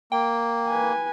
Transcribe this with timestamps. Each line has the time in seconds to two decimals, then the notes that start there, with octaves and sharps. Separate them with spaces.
0.12 A#3 G5
0.68 B4 G#5